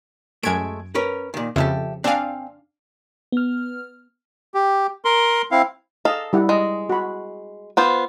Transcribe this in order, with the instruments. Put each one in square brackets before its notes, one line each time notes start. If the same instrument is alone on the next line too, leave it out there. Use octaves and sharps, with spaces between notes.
[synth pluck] F#2 G#6 D7 [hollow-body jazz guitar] G#3 A3
[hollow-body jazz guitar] C#4 A#4 B4
A#2 D#3
[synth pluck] F2 C#3 [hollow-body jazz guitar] G4 A4 E5
[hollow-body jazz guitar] C4 G#5 [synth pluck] D4 F5
[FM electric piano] B3 F6
[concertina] G4
A#4 C6
C4 E4 F5
[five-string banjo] A4 F5 [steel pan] D#5 A5
[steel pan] G3 E4 F#5
[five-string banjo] G#3 [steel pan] D#5
[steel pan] F#4 B5
[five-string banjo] B3 F4 C5